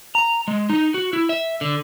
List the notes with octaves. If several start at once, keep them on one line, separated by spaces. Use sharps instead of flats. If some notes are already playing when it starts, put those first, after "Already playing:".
A#5
G#3
D#4
F#4
E4
E5
D3